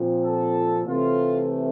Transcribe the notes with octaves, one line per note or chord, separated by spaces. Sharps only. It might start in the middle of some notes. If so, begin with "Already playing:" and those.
Already playing: A#2 F3 C4
A4
C3 E3 A3 F4